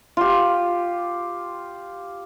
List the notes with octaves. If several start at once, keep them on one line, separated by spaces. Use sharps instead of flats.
F4 G4